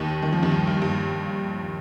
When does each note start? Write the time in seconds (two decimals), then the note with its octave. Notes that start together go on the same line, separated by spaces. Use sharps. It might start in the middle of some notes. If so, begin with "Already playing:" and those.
Already playing: D#2 D#3
0.22 D#3
0.33 F3
0.42 D#2 D#3
0.52 G2
0.67 G2
0.82 G2